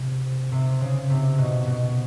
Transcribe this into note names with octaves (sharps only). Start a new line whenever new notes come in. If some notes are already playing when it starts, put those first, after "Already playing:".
Already playing: C3
C3
C#3
C3
B2
B2